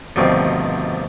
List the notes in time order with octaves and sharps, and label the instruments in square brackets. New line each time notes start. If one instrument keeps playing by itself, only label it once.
[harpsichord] D2 G2 B2 D#3 F3 C4